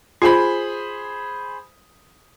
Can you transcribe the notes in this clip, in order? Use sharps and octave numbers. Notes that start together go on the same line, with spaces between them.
F4 G#4 C5 B5